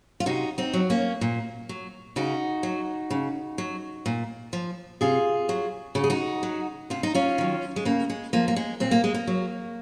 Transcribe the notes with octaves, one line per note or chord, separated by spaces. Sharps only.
F4
C3 D#4 F#4
C4 D#4
F#3
A#3 C#4
A#2
F#3
C#3 D#4 F#4
F#3
C#3
F#3
A#2
F3
C3 F4 G#4
F#3
C#3 F#4
G#4
D#4 F#4
F#3
C3 F4
D#4
C#4 F4
D#3 F#3
G#3
C#3 A#3
G#3
F3 A#3
A#3
G#3
A#2 C4
A#3
G#3
A#3
F#3